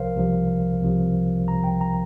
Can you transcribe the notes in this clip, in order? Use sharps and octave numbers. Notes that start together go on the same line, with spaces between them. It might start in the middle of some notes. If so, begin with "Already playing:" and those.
Already playing: C2 C3 F3 A#4 C5 F5
C2 C3 F3
C2 C3 F3
C2 C3 F3 A#5
G5
A#5